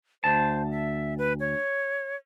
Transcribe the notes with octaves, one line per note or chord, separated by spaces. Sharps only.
D2 C5 A5
E5
B4
C#5